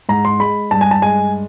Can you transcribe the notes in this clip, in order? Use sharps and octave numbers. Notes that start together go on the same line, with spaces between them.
G#2 A#5
C6
G#3 B5
G2 A5
G#5
A5
G#3 G#5